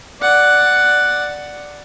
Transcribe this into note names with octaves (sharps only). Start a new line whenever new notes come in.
D5 F#5